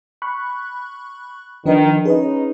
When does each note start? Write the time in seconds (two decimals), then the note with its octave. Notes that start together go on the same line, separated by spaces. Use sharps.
0.22 B5 C#6 F#6
1.66 D#3 F3 D4 B4
2.05 C#4 D#4 G#4 B4 D#5